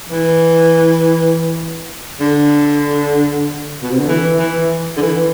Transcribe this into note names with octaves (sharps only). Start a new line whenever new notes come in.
E3
D3
B2
C3
D3
E3
E3
D3
E3